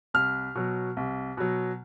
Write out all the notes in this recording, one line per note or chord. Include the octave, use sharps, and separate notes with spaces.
C2 F6
B2 F#3
C2
B2 F#3